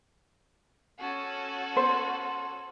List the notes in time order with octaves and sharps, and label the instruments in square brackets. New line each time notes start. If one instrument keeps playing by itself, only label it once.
[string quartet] C#4 F#4 A4
[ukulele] C5